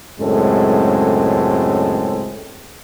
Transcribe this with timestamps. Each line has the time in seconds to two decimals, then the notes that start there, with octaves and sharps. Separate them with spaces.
0.20 C#2 F#2 A2 G#3 C4 A4